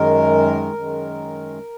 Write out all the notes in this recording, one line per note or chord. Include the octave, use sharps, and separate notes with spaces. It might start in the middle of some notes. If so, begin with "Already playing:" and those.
Already playing: F#2 D#3 G#3 A#4
F#2 D#3 G#3